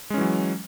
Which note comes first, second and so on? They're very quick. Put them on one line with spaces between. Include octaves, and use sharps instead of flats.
G#3 C#4 E3 F#3